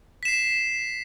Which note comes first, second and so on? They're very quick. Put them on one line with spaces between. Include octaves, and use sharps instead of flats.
B6 E7 C7